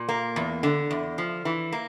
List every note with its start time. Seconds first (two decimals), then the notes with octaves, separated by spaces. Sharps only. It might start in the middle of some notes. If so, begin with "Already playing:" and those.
Already playing: A#2
0.09 A#3
0.36 E2
0.63 D3
0.91 E2
1.18 F3
1.45 E3
1.72 A#3